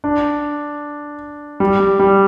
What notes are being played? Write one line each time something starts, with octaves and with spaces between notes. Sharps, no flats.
D4
G3
G3
G3